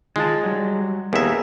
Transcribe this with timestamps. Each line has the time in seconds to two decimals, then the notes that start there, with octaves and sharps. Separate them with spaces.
0.16 D#3 G#3 F4 A5
0.43 F#3 G3
1.13 D#2 B3 G#4 A#4 E5